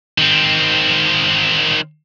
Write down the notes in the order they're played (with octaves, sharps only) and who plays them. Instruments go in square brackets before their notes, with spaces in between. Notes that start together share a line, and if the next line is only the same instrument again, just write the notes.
[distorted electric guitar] D#3 C4